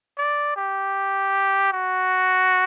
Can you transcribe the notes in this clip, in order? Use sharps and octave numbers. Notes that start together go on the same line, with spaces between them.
D5
G4
F#4